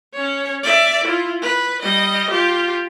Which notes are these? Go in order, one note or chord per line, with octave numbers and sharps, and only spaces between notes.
C#4 C#5
D5 E5
E4 F4
B4
G3 D#5
F4 G4